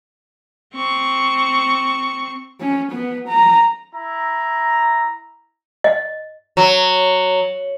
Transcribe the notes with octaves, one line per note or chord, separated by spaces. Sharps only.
C4 C#6
C#4
B3
A#5
E4 A#5
D#5
F#3